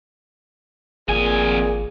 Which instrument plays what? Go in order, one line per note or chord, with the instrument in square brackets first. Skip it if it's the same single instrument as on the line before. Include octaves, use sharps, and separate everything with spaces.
[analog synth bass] G#1 [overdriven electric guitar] F2 G#5 [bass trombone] A#2 [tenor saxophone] G#4